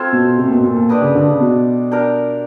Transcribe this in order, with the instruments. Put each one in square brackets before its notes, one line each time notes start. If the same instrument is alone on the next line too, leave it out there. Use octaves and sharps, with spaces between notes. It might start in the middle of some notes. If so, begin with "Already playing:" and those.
Already playing: [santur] C4 F4 A4 C#5
[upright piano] B2
C3
A#2
B2
A#2
A#2
[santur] D4 G4 B4 D#5
[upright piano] C#3
D3
C#3
B2
[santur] D4 G4 A#4